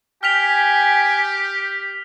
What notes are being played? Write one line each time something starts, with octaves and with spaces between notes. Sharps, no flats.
G4 G5 G#5 F6 B6 F7